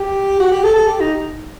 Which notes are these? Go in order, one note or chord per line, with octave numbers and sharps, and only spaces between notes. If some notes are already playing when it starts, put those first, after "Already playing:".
Already playing: G4
F#4
G4
A4
A4
G4
D#4